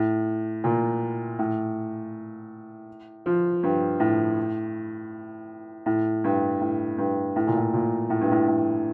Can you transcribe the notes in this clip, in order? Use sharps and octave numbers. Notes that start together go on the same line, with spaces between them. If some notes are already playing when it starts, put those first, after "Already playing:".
Already playing: A2
A#2
A2
F3
G2
A2
A2
G2
A2
G2
A2
A#2
A2
A#2
A2
G2
A2
A2